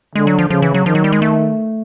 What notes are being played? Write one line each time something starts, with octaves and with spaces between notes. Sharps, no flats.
D3 G#3
F#3
F3
C#3 F3
E3
F#3
D#3 F3
F#3
G3
G#3
A3